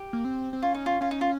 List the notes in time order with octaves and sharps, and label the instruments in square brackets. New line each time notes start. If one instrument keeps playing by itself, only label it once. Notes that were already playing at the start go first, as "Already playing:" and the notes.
Already playing: [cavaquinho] G4
[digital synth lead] A#3
C4
C4
[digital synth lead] C#4 [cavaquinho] F4
[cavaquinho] D#4
F4
[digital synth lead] C#4 [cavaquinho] F4
[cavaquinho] D#4
F4